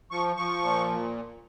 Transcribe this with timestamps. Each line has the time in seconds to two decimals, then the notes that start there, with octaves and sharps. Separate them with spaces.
0.11 F3 C#6
0.36 F3 C#6
0.62 A#2